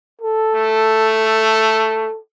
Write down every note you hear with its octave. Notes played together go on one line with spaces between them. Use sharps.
A4
A3